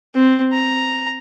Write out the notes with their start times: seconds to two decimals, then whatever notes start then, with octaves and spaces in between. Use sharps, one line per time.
0.14 C4
0.53 A#5